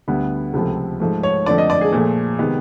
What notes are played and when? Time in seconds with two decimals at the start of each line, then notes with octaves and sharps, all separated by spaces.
0.07 D2 D3 G3 B3
0.53 C#2 C3 F3 A3
1.00 G#2 F3 A3
1.23 C#5
1.46 F2 D3 F3 A3 D5
1.58 D#5
1.70 D5
1.81 G#4
1.92 A#2 F3 A3
2.39 C3 D#3 G#3 B3